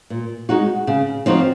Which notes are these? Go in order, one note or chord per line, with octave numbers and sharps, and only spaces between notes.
A#2
G#3 D#4 F#4
C#3
F3 C4 D#4 F#4